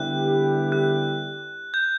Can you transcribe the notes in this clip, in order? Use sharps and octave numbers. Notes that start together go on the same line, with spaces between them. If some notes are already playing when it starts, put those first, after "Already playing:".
Already playing: D3 G3 B3 E4 G4 F#6
F#6
G6